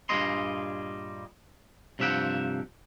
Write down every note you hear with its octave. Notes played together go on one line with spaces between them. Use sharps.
G2 A#2 G3 G#4 D#5 C6
G2 C3 F3 E5 F#5 G5